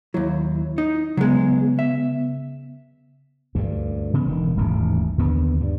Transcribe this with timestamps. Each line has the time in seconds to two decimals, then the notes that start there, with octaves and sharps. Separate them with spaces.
0.14 D#2 F#3 E4
0.78 D#4
1.17 C#3 F#3 G#3 B3
1.79 E5
3.55 D2 G2
4.14 C#3 B3
4.26 E1 D#3
4.57 D#1 A1 G#2 C3
5.18 D#2 D3 B3
5.60 G2